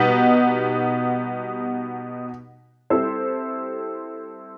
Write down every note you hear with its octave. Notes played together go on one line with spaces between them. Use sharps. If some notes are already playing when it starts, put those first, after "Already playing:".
Already playing: B2 G3 B3 D#4
G3 C4 E4 A4 C5